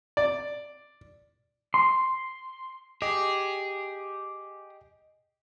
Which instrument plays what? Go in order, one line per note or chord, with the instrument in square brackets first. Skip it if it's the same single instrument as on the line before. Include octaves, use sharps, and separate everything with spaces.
[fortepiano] D5
[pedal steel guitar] C6
[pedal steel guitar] G4 [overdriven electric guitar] G#4 [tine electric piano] D#5